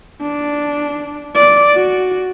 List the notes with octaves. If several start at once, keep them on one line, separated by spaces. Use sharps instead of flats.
D4
D5
F#4